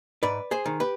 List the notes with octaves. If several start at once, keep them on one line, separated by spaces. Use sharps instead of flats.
G#2 B4 D5
G#4 C5
D#3
G4 B4